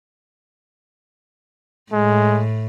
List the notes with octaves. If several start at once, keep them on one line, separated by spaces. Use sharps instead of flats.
A2 G#3